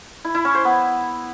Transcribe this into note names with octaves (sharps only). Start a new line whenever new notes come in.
E4
E4
C#4
C5
B3